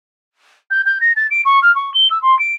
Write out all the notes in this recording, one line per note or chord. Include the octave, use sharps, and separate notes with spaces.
G6
G6
A#6
A6
D7
C#6
F6
C#6
G7
E6
C6
D7